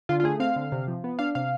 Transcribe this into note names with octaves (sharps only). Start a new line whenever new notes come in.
D3 F4
F4
A3 G#4
C4 F5
D3
C3
F3
B3
D4 F5
C3 F5